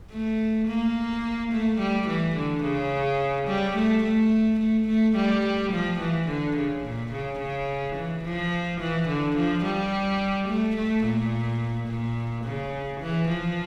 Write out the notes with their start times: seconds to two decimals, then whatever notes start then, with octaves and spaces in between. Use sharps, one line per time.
0.11 A3
0.68 A#3
1.52 A3
1.79 G3
2.08 E3
2.35 D3
2.63 C#3
3.47 G3
3.76 A3
4.03 A3
4.60 A3
4.88 A3
5.16 G3
5.72 F3
6.00 E3
6.27 D3
6.56 C#3
6.84 A#2
7.12 C#3
7.39 C#3
7.96 E3
8.24 F3
8.80 E3
9.08 D3
9.36 F3
9.64 G3
10.48 A3
10.76 A3
11.04 A#2
11.88 A#2
12.44 C#3
13.01 E3
13.28 F3